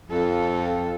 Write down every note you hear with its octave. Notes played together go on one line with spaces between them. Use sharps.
F2 F4 A4